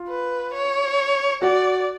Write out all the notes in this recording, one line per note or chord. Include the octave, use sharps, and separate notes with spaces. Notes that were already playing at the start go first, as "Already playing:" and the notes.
Already playing: F4
B4
C#5
F#4 D5 F#5